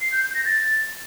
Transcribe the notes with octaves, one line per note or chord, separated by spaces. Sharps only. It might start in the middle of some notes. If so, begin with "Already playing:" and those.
C7
G6
G6
A#6
A6